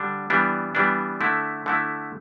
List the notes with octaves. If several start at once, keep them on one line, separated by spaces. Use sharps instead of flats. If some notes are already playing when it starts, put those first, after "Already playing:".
Already playing: D3 G3 D4
E3 G3 B3 D4
E3 G3 B3 D4
D3 A3 E4
D3 A3 E4